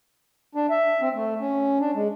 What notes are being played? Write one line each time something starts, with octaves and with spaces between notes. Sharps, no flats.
D4
E5
C4
A3
C#4
D4
G#3